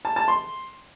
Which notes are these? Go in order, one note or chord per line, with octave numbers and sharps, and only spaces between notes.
A5
A5
C6